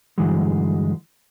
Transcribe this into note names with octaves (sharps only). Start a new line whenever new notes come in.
G2 D3 E3 F#3 G#3